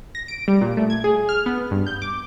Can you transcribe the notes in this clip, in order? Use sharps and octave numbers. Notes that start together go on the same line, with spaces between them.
A#6
D7
G3
A#2
A3
G#6
G#4
F6
B3
G2
G6
D6